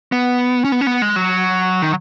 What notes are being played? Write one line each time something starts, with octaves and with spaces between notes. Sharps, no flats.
B3
C#4
B3
C#4
B3
G#3
F#3
D#3